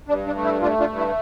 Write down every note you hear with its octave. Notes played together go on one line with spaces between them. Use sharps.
G2 D4
D4
A3
E4
A3 D4 F4
D4 F4
G2
E4